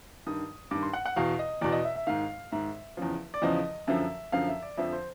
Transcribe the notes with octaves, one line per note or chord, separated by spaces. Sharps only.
G2 D#3 D#6
G2 D#3 D6
C6
F#5
F#5
E2 B2 F5
D#5
E2 B2 D5
D#5
E5
E5
G#2 D#3 F5
G#2 D#3 E5
E2 C#3 F3
D5
E2 C#3 F3 D#5
F#2 D3 F3 E5
F#2 D3 F3 F5
E5
D5
F2 D3 F3 E5
C5